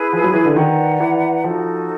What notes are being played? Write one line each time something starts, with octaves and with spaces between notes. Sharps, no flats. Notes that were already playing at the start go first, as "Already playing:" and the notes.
Already playing: E4 G#4 B4
F3
F#3
E3
D3
D#3 B4 D5 F#5 A#5
E3
F3 D#4 F#4 A4